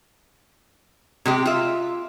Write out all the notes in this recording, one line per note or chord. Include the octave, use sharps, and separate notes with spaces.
C3 G#3 G4
F4 E5